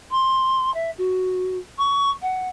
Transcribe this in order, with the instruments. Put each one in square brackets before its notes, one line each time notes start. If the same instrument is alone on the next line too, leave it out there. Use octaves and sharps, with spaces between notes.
[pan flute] C6
E5
F#4
C#6
F#5